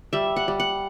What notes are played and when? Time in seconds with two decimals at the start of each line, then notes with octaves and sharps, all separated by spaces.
0.13 G3 E5
0.36 F#5
0.48 G3
0.60 F#5